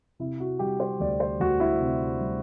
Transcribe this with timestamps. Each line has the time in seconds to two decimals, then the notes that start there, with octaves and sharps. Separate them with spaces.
0.19 C3 E4
0.40 F#4
0.59 G3 G4
0.80 C5
1.00 D2 D5
1.20 C5
1.40 D2 F#4
1.60 E4
1.80 C3
2.20 G3